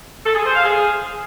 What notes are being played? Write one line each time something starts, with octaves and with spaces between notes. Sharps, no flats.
A4
G#4
C5
F5
G#4